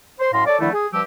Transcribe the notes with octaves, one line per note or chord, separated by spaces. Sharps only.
C5 C6
F#2 A2 F5 A#5 C6
A4 C#5 D5
D3 D#3 F3 A3 E4
G#4
G2 F3 G3 G4 E6